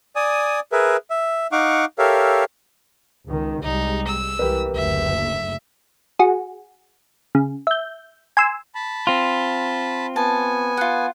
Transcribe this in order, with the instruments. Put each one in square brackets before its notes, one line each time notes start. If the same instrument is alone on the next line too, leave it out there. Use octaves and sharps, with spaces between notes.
[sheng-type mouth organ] D5 G#5 D#6
G#4 A#4 B4 E5
E5
D#4 F5 F#5 C#6 D6
G4 A4 A#4 C#5 E5 F5
[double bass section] C#2 D#3
[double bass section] C2 G3 G#3 [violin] D#4
[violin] E6
[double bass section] C2 E3 [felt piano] G4 A#4 B4
[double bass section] F#1 D2 [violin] E5
[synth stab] F#4 G#4
C#3
E5 G6
G#5 C6 E6
[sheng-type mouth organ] A5 B5
[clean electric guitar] C4 F4
[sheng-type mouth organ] B3 G#5 [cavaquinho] A5
[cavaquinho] F4 F#5